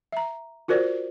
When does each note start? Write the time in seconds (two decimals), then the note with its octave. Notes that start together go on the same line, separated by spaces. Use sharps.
0.12 E5 A#5
0.68 F4 F#4 A#4 C5 D5